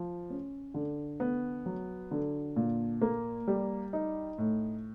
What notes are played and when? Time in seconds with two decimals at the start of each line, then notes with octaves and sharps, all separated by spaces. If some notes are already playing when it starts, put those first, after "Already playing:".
Already playing: F3
0.30 C#4
0.74 D3
1.20 B3
1.66 F#3
2.11 D3
2.56 A#2
3.02 A#3
3.48 G3
3.93 D#4
4.38 A2